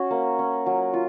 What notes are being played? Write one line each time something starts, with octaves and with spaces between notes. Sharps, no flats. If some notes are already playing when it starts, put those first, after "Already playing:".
Already playing: C#4 F#4
A#3
C#4
F#3
F4